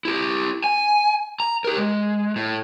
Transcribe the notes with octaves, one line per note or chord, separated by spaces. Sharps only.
E4 G4
G#5
A#5
G4 A#4
G#3
A2